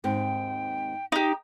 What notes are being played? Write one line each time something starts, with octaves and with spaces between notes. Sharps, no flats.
D#2 G#2 C4 G5
D#4 G4